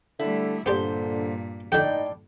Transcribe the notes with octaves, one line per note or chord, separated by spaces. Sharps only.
D3 G3 A3 E4
G2 A#2 D3 B3 G4 C5 D5
F2 A2 D3 D#4 D5 G5